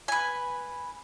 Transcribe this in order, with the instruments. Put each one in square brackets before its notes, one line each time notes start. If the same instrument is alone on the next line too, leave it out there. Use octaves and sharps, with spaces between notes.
[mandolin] B4 G#5